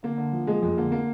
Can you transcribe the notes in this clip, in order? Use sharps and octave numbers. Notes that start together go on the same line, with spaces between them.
D3 A#3
D3
F3
F3 G#3
F2 G#3
D3 A#3
A#3